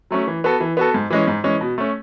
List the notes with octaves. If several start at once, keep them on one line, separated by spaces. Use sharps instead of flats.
F#3 A3 C#4
E3
B3 F#4 A4
E3
B3 F#4 A4
G#2
E3 G#3 C#4
G#2
E3 G#3 C#4
B2
A3 C#4